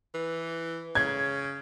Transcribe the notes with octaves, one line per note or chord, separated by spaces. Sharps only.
E3
C#3 G#6